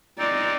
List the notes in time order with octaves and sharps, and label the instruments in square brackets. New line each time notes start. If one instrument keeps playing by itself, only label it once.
[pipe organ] G#3 C4 D#4 [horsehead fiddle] D5